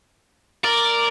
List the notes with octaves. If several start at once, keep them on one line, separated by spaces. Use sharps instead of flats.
A#4 D5